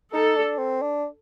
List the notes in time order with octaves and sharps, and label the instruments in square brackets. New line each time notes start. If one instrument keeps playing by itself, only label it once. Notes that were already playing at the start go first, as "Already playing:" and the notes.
[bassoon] D#4 [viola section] A4
[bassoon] D4
C4
D4